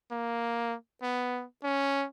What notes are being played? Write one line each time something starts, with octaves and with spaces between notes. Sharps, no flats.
A#3
B3
C#4